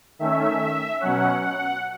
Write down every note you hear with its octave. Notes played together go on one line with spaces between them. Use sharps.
D#3 A3 C#4 E5
B2 F#3 C#4 F#5
F#5